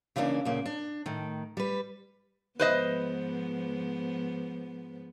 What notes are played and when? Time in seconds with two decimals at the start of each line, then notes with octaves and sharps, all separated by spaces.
0.16 C#3 E3 A#3 B3 D4
0.45 D2 A#2 C#3 A#3
0.66 D4
1.06 A2 D#3
1.57 G3 B4
2.60 G#2 F3 B3 B4 C5 D#5